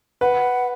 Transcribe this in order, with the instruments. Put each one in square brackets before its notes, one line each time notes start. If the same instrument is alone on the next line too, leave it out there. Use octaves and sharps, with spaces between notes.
[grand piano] B4 [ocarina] F#5